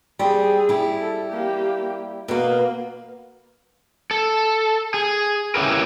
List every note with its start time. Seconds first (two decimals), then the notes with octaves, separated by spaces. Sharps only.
0.19 G3 C4 G#4
0.69 G3 E4
1.00 A4
1.30 A#3 G4
2.28 B2 A#3 B3
4.11 A4
4.94 G#4
5.55 C#4 E4 G4 A#4 B4